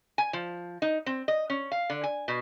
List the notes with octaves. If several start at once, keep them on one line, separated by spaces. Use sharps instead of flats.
G#5
F3
D#4
C4
D#5
C#4
F5
D3
G#5
B2